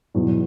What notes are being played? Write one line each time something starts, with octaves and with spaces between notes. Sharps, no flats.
E2 B2 F#3